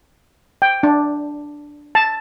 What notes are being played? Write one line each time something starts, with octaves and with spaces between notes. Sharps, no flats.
G5
D4
A5